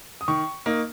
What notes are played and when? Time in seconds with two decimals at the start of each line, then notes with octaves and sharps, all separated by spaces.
0.21 D#6
0.28 D#3 C#6
0.66 A#3 D#4